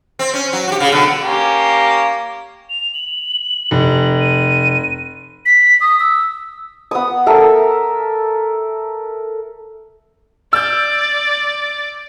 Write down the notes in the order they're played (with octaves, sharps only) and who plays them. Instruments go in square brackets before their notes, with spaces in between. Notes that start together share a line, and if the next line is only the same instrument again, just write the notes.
[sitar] C4
C#4
F#3
F#4 G4
C#3
B2 D3 F#3
[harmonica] A#3 C#4 G4
[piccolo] F7
F#7
[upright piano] F1
[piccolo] D#7
B6
D#6
E6
[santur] B3 D#6
A4 A#4 E5
[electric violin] D5 [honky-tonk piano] E6 G6